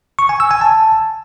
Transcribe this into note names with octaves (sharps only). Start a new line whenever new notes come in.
C#6
G#5
E6
G#5
A5